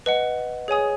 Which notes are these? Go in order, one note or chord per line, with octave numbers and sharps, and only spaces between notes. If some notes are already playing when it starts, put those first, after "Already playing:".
B4 D#5 F#5
G#4 C#5 G#5 D#6